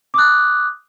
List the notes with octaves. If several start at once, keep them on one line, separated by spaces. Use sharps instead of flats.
D6 D#6 F#6